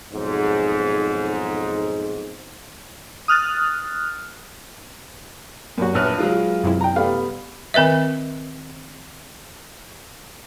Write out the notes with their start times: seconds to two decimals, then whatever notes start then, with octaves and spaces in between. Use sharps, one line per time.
0.13 B1 F2 G#2
3.28 D#6 F6 F#6 A6
5.78 F#2 A#2 F#4
5.94 D#1 A#1 C#4 B4 F6
6.18 F#3 G#3 F4
6.64 F#2 C3 E4
6.81 G5 A#5
6.96 G3 A3 B3 F5
7.74 D#3 C4 B4 D#5 E5